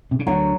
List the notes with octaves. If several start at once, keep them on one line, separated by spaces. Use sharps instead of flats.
C3
C#3
D2 D3 F#3